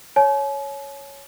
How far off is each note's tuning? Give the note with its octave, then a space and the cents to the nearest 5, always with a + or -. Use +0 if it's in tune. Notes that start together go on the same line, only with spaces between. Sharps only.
C#5 +0 G#5 +45